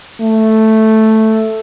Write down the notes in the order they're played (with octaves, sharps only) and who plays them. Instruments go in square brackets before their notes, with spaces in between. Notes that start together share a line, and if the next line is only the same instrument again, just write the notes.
[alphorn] A3